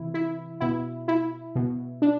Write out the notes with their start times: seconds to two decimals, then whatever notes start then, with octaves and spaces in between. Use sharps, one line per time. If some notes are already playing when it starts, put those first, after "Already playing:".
Already playing: C3 E3 E4
0.14 E4
0.60 B2 E4
1.08 E4
1.55 B2
2.02 D4